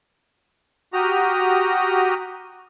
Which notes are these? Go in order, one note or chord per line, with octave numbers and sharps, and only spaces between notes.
F#4 G4 A#5 D#6 F6